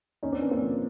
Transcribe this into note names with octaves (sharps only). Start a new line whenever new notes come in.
D#2 C#4 D#4
C4 D4
D#2 B3 C#4
A#3 C4
F3